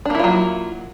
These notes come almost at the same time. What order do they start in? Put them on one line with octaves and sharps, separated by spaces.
D4 A#3 E4 F4 F#3